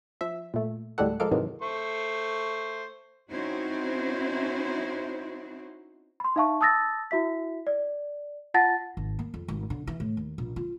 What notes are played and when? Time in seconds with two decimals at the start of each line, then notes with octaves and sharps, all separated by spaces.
0.21 F3 E5
0.54 A#2 A3
0.98 D2 A2 G3 G#3 A4 F#5
1.20 F3 G#3 A4 A#4 F5 D6
1.31 G#2 C3 D#3 E3 F#3 G#3
1.62 A3 C5 C#6
3.30 C4 C#4 D#4 E4 F#4 C5
6.20 B5 C6
6.36 D#4 E5 F5 A5 C#6
6.61 A5 D#6 E6 A6 A#6
7.11 E4 F#4 E5 B6
7.67 D5
8.54 F4 F#5 A5 A6 A#6
8.97 G#1
9.19 A#3
9.34 F2
9.48 G#1
9.70 D3
9.87 E3
10.00 A2
10.17 D#2
10.38 A#1
10.56 F4